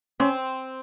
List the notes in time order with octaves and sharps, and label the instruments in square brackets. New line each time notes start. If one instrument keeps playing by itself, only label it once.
[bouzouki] C4 [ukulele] C#4